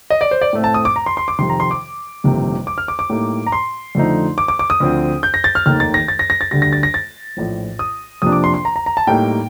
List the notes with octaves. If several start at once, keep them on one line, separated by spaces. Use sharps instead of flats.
D#5
D5
C5
D5
A2 A3 C4
A5
D#6
D6
A#5
C6
C6
D6
F2 C3 D#3 C6
A#5
C6
D6
G1 F2 C3 D#3 A#3
D6
F6
D6
D6
A2 G3 A#3 D#4
A#5
C6
F2 D3 F3 A3 D#4
D6
D6
D6
D#6
D2 D3 F3 C4
G6
A#6
A6
F6
F1 D#2 D#3 A#3 D#4 F6
A6
A#6
A6
A#6
A#6
A6
D2 D3 G3 A#6
A#6
A6
A#6
A6
A#1 A2 F3
D#6
F2 C3 F3 A#3 D4 D#6
D6
C6
C6
A#5
A#5
A#5
A5
A2 G3 A#3 D#4 G5